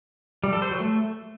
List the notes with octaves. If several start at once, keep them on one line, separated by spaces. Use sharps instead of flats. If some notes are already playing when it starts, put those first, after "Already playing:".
G3
A4
C5
F#3
A3